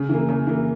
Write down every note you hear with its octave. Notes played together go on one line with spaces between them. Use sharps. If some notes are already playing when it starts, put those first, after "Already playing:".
Already playing: C#3
E3 A#3
C#3
E3 A#3